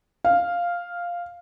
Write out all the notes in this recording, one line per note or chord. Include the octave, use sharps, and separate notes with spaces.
F5